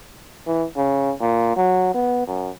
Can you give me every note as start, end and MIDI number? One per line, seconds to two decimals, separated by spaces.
0.47 0.65 52
0.77 1.12 49
1.21 1.55 46
1.57 1.92 54
1.94 2.23 59
2.27 2.50 42